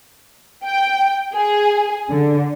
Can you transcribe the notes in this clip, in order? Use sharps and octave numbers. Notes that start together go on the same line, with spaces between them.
G5
G#4
D3